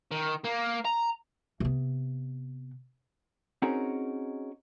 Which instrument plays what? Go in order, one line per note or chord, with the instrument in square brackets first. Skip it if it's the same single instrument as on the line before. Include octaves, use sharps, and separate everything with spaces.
[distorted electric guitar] D#3
A#3
A#5
[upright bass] C3 B3
[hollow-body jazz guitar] C4 C#4 D#4 F#4 G#4 A#4